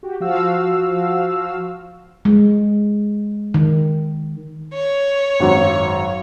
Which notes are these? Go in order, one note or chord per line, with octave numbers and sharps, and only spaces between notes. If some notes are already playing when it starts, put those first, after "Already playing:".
F#4 G4
F3 F#4 F5 E6
G#3
D#3
C#5
G#1 F#2